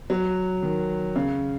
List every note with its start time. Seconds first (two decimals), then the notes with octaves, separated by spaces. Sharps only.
0.10 F#3
0.62 D#3
1.16 C#3